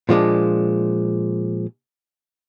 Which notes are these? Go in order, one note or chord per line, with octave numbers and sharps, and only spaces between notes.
A#2 F3 G#3 D4